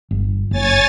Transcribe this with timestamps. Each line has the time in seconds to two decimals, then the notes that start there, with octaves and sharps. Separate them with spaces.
0.11 G1
0.51 F#1 C#5 G#5 A6